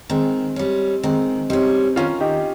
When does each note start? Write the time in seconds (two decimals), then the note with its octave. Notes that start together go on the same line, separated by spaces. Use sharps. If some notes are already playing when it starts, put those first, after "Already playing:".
0.10 D#3 G#3 C4
0.56 G3 C#4
1.03 D#3 G#3 C4
1.50 G3 C4 C#4 D#4
1.96 D#3 C#4 F4
2.20 D#4 G4